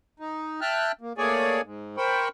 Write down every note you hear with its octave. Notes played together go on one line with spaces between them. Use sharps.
D#4
E5 G5 A5 F6 F#6
A#3
A3 A#3 G#4 C#5 D5 G#5
G#2
A#4 C5 G5 B5 C#6